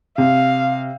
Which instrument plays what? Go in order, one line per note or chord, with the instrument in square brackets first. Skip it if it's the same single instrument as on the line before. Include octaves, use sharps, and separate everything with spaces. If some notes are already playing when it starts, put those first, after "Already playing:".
[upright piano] C3 [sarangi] F5